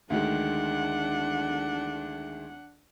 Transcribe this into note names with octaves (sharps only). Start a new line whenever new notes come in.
D2 D#3 G#3 D4 F#5